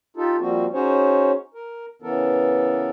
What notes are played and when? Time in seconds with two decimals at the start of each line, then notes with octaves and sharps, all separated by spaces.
0.17 D#4 F4 G4 A4
0.40 F3 G3 A#3 C4 F#4
0.73 C#4 D#4 F#4 G#4 C5 C#5
1.54 A#4
2.02 C#3 E3 B3 A4 A#4